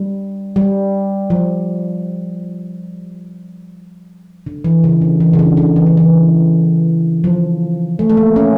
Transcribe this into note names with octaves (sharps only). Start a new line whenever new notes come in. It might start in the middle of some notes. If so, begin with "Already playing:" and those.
Already playing: G3
G3
F3
D3
E3
C#3
D3
E3
C#3
D3
D3
E3
D3
E3
F3
A3
A3
A#3
C#4